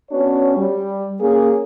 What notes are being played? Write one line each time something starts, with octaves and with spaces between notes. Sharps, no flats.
B3 C#4 D4 F#4 C#5
G3
A#3 C#4 G#4